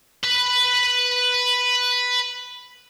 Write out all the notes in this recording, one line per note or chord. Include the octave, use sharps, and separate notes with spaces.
B4 B5